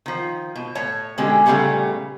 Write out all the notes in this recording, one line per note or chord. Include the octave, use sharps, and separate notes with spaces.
D#3 F3
B2
A2 C#5 A5
B2 D3 G#3 C#4 G4
A#2 C#3 E3 G3 A3 B3